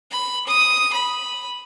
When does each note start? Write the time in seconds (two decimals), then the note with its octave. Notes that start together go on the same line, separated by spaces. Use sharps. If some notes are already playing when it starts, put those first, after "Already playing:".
0.11 B5
0.47 D#6
0.93 B5